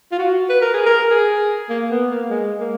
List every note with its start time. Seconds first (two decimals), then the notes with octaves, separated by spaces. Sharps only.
0.12 F4
0.19 F#4
0.49 B4
0.62 A#4
0.74 G#4
0.86 A#4
1.10 G#4
1.69 A#3
1.91 B3
2.10 A#3
2.30 G#3
2.60 A#3